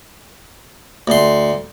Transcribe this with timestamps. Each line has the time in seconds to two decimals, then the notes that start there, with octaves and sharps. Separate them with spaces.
1.08 D2 C6